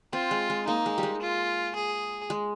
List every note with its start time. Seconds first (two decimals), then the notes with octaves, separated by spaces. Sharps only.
0.13 C4 F4
0.31 G#3
0.50 G#3
0.67 A#3 D#4
0.86 G#3
0.98 G3
1.03 G#3
1.22 F4
1.76 G#4
2.30 G#3